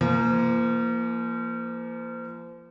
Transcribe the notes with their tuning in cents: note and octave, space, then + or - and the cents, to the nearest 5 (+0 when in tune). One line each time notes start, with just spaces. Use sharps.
F3 -35 A#3 +0